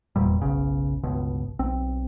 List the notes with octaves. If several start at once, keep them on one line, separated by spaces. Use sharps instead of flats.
F1 E2 A#2 G3
F#1 B1 C#3
G1 C#2 B2
B1 C4